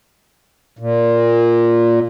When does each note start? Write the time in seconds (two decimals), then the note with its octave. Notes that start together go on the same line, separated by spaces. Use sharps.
0.79 A#2